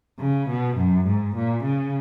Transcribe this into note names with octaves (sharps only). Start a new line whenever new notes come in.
C#3
B2
F#2
G#2
A#2
C#3